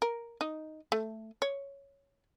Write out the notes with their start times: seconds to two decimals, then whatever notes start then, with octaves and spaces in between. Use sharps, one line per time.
0.02 A#4
0.41 D#4
0.92 A3
1.42 C#5